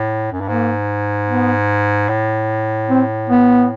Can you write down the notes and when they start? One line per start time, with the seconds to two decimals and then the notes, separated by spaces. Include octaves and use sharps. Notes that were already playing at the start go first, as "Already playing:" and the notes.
Already playing: A2
0.32 F#2
0.40 G2
0.48 G#2 A#3
1.28 B3
2.08 A2
2.90 C4
3.30 B3